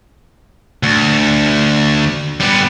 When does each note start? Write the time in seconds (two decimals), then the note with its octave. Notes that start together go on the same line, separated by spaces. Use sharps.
0.83 D2
2.40 G3 B3